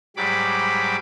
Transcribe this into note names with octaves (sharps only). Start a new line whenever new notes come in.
G#2 F#3 G3 B5 D6